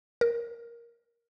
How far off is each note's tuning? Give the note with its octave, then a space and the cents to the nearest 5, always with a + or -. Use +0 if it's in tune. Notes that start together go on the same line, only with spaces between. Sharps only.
A#4 +5